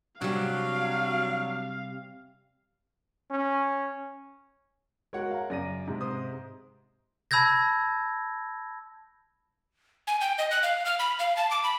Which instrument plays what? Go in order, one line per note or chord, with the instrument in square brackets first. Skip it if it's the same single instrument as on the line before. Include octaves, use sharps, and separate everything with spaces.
[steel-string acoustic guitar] C3 G3 [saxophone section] F#3 D4 [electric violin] F5
[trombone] C#4
[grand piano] G#3 F#4 [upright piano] A#4 C#5 F#5
[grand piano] F5 A#5
[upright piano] F#2 D#7 [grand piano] C#3 D5 A#6
[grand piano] G#2 C3
[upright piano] C5 D#6
[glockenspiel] A5 B5 E6 G6 G#6 A#6
[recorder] G#5
G5
D#5
F#6
F5
F6
B5
F5
A5
D6
B5